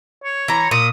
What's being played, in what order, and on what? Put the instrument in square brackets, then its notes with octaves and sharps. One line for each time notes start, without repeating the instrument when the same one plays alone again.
[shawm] C#5
[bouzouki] E3 A#5
[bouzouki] A#2 [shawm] D#6